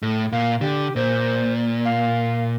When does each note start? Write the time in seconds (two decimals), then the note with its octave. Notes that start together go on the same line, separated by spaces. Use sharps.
0.03 A2
0.32 A#2 F5
0.61 D3 G4
0.96 A#2 C5
1.85 F5